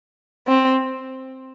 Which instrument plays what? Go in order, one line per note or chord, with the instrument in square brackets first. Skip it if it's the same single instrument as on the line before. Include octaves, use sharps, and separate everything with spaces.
[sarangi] C4